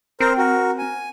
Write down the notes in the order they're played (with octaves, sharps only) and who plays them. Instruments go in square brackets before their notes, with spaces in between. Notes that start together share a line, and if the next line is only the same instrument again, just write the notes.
[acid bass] C4 [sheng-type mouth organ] A#4 C5
[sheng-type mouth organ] F#4 A#4
G#5